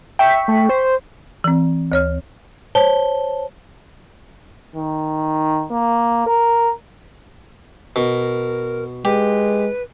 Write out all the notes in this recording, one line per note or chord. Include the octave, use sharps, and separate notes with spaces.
E5 G5 C#6 B6
A3
C5
E3 C4
D2 C#5 F6
C5 C#5 A5 G7
D#3
A#3
A#4
B2 A#4
G#3 G4 B4